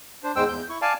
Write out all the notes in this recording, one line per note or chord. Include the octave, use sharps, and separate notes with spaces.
D4 C5
E2 G#2 G#3 C5 G5 E6
E2 G6
E4 C#6
D5 F5 G#5 A5